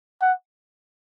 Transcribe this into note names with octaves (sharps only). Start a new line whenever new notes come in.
F#5